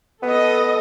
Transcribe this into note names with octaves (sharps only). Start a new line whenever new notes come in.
B3 A4 D#5